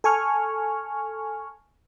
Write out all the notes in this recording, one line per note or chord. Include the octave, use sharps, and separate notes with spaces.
A4 G#5 C#6 F6